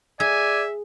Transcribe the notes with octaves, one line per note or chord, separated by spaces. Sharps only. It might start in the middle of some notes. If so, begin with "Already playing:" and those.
G#4 D5 E5 G#5